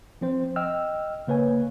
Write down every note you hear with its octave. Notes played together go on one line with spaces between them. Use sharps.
F3 C4 C5
D#5 G5 E6 F6
C#3 A#3 B4 C#5 G#5